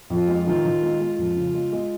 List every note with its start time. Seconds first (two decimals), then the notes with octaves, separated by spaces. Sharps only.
0.10 F2 F4
0.28 G#3
0.47 D#3 F4
0.65 D#3
0.83 G#3
1.00 G#3
1.18 F2 F4
1.36 C#3
1.54 G#3
1.73 G#3